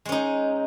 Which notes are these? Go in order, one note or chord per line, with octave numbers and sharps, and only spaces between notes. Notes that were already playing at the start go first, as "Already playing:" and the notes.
G#3 C#4 D#4